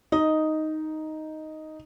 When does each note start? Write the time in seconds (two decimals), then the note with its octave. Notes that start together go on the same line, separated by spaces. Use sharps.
0.12 D#4 D#5